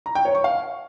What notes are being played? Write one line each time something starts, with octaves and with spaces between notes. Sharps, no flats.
A#5
G5
C#5
C#6
F5